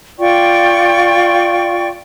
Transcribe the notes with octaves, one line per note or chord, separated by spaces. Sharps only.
F4 D5 G5 C#6